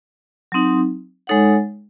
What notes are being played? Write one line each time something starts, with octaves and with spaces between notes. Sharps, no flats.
F#3 C4 D#4
G#3 D#4 A4 C#5 F#5